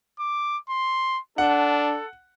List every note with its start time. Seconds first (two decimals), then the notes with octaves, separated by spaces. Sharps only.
0.19 D6
0.69 C6
1.38 D4 A4 F#5